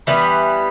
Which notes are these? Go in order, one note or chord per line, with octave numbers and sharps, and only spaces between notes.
E3 G3 B3 B5